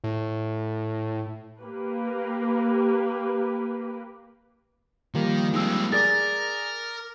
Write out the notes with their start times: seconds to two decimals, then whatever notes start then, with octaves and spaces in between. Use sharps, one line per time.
0.04 A2
1.59 A#3 G4 B4
5.15 D#3 F3 G3 A#3
5.54 G#3 C4 D#4 E6
5.92 G#4 A#4 D5 D6 A6